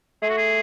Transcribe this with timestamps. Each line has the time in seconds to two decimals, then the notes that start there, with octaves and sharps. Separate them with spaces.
0.22 A3 G#4
0.30 F#4
0.37 G#4